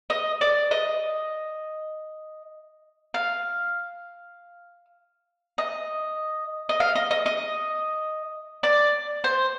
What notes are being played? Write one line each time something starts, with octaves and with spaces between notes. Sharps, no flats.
D#5
D5
D#5
F5
D#5
D#5
F5
D#5
D#5
D#5
D5
C5